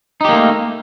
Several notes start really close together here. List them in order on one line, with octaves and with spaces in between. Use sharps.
D#4 G4 A#3 A3